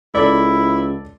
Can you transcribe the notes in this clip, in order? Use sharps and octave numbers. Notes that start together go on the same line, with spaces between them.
C#2 E4 A4 D5